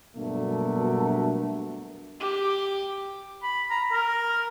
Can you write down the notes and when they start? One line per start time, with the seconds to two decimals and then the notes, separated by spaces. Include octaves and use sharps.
0.17 G2 B2 F#3 A3 A#3 D4
2.20 G4
3.43 B5
3.70 A#5
3.92 A#4